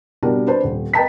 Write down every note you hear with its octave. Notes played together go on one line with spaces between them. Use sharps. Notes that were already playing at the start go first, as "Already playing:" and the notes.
B2 G3 D4 F#4 A#4
D4 B4 C5 A5
D#1
B4 D#5 G5 A5 A#5 B6